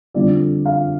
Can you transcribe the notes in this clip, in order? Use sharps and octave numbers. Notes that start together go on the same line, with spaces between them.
F2 D3 G3 D5
F5